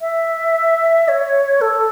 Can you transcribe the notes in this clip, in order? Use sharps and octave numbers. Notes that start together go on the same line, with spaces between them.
E5
C#5
A4